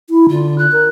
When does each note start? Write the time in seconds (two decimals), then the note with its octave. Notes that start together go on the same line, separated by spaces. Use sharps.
0.10 E4
0.30 D3 F4
0.58 F#6
0.72 A#4